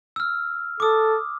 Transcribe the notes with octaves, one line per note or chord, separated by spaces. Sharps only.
E6 F6
A4 D6 D#6